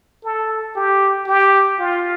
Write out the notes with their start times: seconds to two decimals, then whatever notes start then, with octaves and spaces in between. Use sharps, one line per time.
0.24 A4
0.76 G4
1.27 G4
1.79 F4